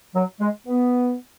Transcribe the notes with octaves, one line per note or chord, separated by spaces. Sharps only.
F#3
G#3
B3